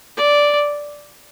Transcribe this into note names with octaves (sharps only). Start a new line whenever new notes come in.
D5